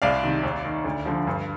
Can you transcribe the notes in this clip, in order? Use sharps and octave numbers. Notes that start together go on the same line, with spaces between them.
C2 D5 F5
C3 D#3
D#2
D#3
D2
D3 F3
G2